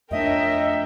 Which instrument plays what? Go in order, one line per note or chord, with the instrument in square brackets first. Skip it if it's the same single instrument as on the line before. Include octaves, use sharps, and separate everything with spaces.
[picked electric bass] F2 A3 D4 [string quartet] A#4 C#5 G5 [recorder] D#5 [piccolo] E5